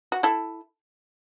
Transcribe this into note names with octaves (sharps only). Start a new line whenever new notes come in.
F#4
E4 A4